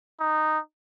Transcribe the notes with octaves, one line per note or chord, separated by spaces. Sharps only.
D#4